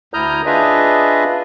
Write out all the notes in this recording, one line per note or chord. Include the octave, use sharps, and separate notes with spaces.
D2 E4 A#5 D#6 F6 G6
D4 F4 G#4 B4 D#5 E5